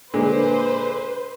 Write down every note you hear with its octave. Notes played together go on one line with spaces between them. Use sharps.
A#2 D3 G#3 B4 C5